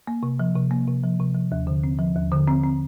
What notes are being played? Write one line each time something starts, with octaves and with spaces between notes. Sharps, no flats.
A#3
C3
F3
C3
A#3
C3
F3
C3
F3
D#2
D3
C4
F3
D#2
D3
C4
C4